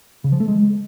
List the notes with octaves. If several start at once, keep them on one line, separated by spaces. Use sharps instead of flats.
C#3
F3
A3
G#3